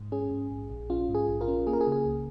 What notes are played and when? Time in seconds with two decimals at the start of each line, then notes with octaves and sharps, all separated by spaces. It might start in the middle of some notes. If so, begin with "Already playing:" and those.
Already playing: G#2
0.12 C#4 G#4
0.31 G#2
0.50 A#1
0.70 A#1
0.90 C#4 F4
1.09 G#2
1.15 G#4
1.28 A#1
1.41 F4 A#4
1.48 C#4
1.67 A#3 G#4
1.73 A#4
1.81 G#4
1.87 C#3
1.92 G#4
2.05 C#2